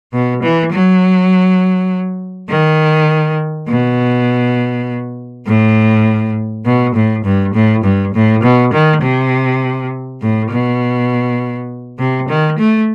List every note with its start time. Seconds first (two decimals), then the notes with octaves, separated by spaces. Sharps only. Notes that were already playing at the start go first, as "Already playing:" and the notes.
0.13 B2
0.43 E3
0.72 F#3
2.50 D#3
3.69 B2
5.47 A2
6.66 B2
6.95 A2
7.25 G2
7.54 A2
7.84 G2
8.14 A2
8.43 B2
8.73 D#3
9.02 C3
10.21 A2
10.51 B2
11.99 C3
12.29 D#3
12.59 A3